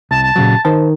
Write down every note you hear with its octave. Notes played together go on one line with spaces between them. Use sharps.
C2 A5
A5
A#2 C#3 F#3
D#3 C5 A5